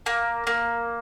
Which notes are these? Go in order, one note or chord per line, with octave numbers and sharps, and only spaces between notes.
A#3
A#3